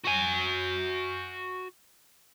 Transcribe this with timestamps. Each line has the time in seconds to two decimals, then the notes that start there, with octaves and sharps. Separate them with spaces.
0.04 F#4 G#5